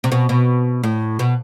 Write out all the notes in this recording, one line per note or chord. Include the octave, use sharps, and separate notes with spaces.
C3
B2
B2
A2
B2